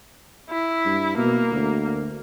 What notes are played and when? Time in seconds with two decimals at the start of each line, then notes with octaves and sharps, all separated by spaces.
0.50 E4
0.85 G2
1.17 B2 A#3
1.52 D2